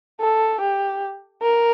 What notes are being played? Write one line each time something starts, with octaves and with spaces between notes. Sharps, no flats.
A4
G4
A#4